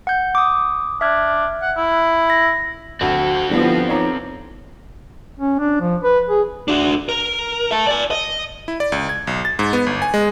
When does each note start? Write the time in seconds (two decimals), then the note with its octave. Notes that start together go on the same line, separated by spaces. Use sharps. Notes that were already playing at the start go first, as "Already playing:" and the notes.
0.07 F#5 G6
0.35 D6 D#6
1.01 D4 E5 F6 G#6
1.62 F#5
1.77 E4
2.30 A#6
3.01 D2 C4 F#4 A4
3.50 D3 F3 G3 B3 E4
3.89 D#4 C#5 A#5 D6
5.39 C#4
5.59 D4
5.81 F3
6.03 B4
6.29 G#4
6.68 D4 F#4
7.09 A#4
7.71 E5 A5
7.87 D5 G#5
8.11 D#5
8.68 E4
8.80 D5
8.92 C#2
9.09 G#6
9.27 B1
9.45 A6
9.59 G#2
9.73 B3
9.86 G1
10.02 G#5
10.14 G#3